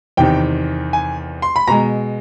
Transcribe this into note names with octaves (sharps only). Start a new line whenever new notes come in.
E2 C3 D#3 G5
G#5
C6
B5
B2 G#3 A#5